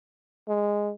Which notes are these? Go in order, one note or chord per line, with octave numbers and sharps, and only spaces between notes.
G#3